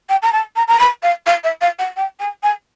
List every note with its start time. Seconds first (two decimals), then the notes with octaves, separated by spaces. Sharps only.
0.09 G5
0.22 A#5
0.32 A5
0.56 A#5
0.68 A#5
0.79 B5
1.03 F5
1.26 F5
1.43 E5
1.61 F5
1.79 F#5
1.96 G5
2.19 G#5
2.43 G#5